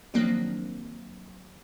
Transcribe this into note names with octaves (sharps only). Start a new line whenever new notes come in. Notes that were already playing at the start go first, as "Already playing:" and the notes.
D#3 F3 F#3 A#3 C4 D4